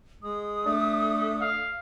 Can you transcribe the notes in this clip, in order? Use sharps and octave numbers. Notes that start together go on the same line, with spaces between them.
G#3 D#6
A3 D4
F5